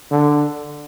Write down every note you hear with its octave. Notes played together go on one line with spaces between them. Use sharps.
D3